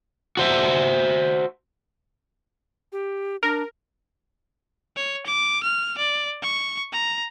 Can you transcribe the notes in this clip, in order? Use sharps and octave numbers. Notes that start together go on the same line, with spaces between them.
F#4 C5 E5
G4
D4 A#4
C#5
D6
F6
D5
C#6
A#5